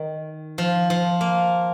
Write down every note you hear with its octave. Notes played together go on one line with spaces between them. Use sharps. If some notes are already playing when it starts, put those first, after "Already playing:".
Already playing: D#3
F3
F3
A#3